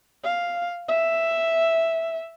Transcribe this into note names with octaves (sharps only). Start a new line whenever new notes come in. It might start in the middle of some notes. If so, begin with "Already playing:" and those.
F5
E5